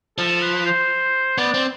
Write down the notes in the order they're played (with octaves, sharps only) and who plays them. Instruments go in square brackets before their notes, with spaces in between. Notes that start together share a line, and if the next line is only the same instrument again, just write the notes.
[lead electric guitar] F3 [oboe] A4
[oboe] B4
C5
[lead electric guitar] B3 [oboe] D5
[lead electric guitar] C4